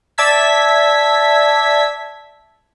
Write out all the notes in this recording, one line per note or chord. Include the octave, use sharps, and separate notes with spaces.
D5 E5 A5 E6 G#6 B6